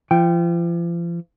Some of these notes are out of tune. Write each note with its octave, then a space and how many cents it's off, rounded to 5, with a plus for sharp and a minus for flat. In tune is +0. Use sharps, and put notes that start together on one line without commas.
F3 -40 G5 +0